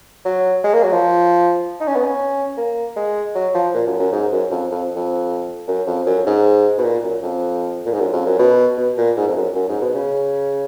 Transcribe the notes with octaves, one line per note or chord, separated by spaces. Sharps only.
F#3
G#3
A#3
F#3
F3
D#4
C#4
B3
C#4
A#3
G#3
F#3
F3
A#2
F#2
F#2
G#2
F#2
F2
F2
F2
F#2
F2
F#2
G#2
B2
A#2
F#2
F2
A#2
G#2
F#2
F2
F#2
B2
B2
A#2
G#2
F2
F#2
F#2
G#2
B2
C#3